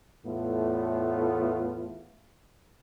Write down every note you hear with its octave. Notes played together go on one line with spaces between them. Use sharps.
E2 A2 A3 B3 F4